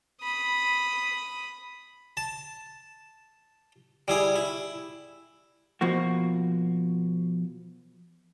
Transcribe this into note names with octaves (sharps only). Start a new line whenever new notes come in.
B5 D#6
A5
G3 E4 G#4
E4
B2 F3 A#3 F#4